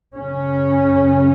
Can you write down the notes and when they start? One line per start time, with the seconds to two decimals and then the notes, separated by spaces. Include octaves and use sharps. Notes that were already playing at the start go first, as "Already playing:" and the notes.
0.15 F#2 C#3 C#4